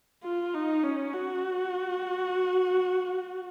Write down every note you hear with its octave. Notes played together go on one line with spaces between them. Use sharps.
F4
D#4
C#4
F#4